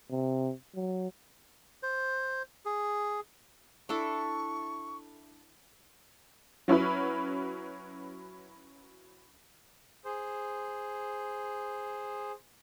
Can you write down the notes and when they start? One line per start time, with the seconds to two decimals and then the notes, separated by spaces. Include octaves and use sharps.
0.10 C3
0.75 F#3
1.83 C5
2.65 G#4
3.89 D4 E4 A4 C#6
6.68 F#3 C#4 E4 B4
10.05 G#4 C5